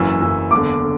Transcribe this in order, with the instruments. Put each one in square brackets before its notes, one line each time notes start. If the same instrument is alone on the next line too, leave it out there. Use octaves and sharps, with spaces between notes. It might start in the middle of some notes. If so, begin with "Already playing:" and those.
Already playing: [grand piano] F#1 F#2 E3 [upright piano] E6
[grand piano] F#1 F#2 E3
[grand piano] F#1 E2 D3 [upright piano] D6
[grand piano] D3